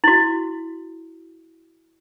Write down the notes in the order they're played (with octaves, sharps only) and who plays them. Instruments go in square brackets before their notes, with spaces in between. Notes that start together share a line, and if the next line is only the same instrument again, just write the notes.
[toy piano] E4 F#4